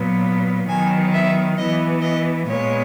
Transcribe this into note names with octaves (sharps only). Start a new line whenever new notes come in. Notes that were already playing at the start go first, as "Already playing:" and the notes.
Already playing: A#2 F#3 B3
D#3 F#3 B3 G#5
E5
E3 B3 D#5
D#5
A#2 G#3 B3 C#5